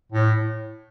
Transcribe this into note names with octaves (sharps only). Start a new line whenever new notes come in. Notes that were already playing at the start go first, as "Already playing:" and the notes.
A2